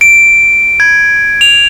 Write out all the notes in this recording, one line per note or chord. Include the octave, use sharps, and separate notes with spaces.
D7
G#6
F7